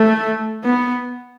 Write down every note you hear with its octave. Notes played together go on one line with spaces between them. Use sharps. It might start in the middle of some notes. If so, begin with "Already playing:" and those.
Already playing: A3
B3